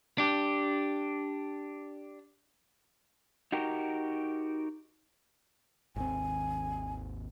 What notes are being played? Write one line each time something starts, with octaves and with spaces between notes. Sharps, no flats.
D4 G4
D#4 F#4 G4 A#4
G#1 D#2 C4 G#5